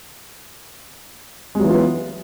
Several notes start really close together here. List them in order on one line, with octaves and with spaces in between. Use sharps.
G#3 F#3 E3 F4 B3